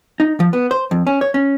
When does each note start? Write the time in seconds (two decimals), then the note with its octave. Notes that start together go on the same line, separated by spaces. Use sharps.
0.20 D#4
0.40 F3
0.53 B3
0.71 C5
0.91 F2
1.07 C#4
1.21 C#5
1.34 C#4